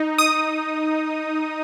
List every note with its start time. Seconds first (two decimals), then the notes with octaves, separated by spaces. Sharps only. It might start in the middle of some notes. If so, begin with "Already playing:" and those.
Already playing: D#4
0.18 D#6